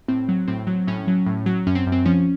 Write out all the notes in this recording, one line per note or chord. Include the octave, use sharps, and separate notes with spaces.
A2 C4
F#3
A2 C4
F#3
A2 C#4
F#3
A2
F#3
F#2 C#4
C4
F#2
C4
F3 C#4